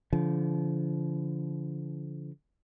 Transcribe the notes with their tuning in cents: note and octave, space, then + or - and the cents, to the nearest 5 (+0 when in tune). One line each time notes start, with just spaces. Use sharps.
D3 -40 F3 -30